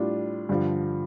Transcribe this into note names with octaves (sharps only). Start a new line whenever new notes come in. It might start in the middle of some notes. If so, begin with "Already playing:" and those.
Already playing: A2 G3 D4 F4
G2 D3 F3